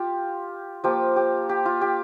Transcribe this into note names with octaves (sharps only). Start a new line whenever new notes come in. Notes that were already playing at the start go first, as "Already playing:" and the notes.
Already playing: F4 G4
F3 A#3 F4 G4
G4
G4
F4
G4